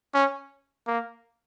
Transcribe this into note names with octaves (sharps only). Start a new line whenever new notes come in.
C#4
A#3